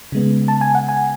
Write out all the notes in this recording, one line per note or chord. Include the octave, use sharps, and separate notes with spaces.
C#3 G#3 B3
A5
G#5
F#5
G#5